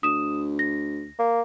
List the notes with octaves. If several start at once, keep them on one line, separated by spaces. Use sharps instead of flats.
D2 D#6 E7
A#6
A#3